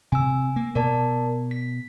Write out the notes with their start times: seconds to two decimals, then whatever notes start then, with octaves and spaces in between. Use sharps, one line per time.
0.12 C3 G#5 E6
0.56 A#3
0.75 B2 A#4 D5 A5
1.51 B6